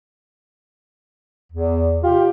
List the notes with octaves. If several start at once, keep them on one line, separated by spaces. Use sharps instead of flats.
E2
C3 F4 G4